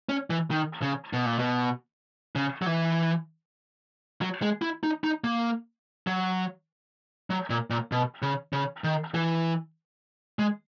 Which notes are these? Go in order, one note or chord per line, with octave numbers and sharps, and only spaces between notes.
C#4
E3
D#3
C#3
B2
A#2
B2
C#3
F#3
E3
F#3
G#3
E4
D#4
D#4
A#3
F#3
F#3
A#2
A#2
B2
C#3
C#3
D#3
E3
G#3